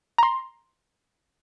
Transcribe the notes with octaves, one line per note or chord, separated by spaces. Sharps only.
A#5 C6